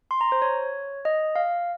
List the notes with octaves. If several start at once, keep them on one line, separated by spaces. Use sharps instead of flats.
C6
A#5
C5
C#5
D#5
F5